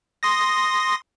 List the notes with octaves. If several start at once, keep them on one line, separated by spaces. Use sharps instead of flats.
C6 D#6 A#6